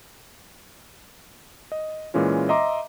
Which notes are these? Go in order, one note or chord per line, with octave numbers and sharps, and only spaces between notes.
D#5
A#2 E3 G#3 C#4 F4
D#5 E5 A#5 C6 D6